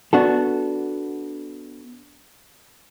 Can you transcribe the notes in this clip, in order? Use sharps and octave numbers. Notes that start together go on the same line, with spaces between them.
B3 D4 F#4 A4